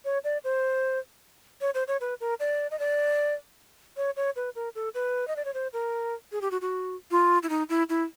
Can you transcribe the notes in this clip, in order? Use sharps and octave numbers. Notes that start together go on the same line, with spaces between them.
C#5
D5
C5
C#5
C5
C#5
B4
A#4
D5
D#5
D5
C#5
C#5
B4
A#4
A4
B4
D#5
D5
C#5
C5
A#4
G#4
G4
F#4
F#4
F4
E4
D#4
E4
E4